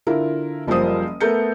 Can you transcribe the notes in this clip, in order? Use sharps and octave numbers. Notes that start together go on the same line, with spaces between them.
D3 E4 F4 A#4
F#1 F3 G3 A#4 C5 D#6
A3 B3 A4 A#4 G6 C#7